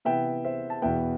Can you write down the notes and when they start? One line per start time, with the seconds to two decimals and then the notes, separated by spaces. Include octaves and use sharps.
0.05 C3 E3 B3 E5 G5
0.45 C5 E5
0.70 A5
0.82 E2 B2 B3 E5 G5